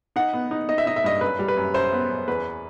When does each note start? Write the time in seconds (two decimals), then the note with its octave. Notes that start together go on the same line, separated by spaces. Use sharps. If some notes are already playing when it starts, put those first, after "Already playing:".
0.16 D#4 F#5
0.33 B3
0.51 D#4
0.69 D#4 D#5
0.78 E5
0.86 D#4 D#5
0.96 E5
1.04 G2 D#5
1.21 F#2 B4
1.39 G3
1.48 B4
1.57 F#2
1.74 F#2 C5
1.92 B3
2.10 F#2
2.28 E2 B4